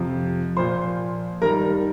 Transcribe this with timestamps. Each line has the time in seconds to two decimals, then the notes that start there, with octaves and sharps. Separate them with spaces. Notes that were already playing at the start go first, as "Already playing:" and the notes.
Already playing: F2 C3 F3
0.57 A#2 F3 C5 C6
1.42 G2 D#3 G3 A#4 A#5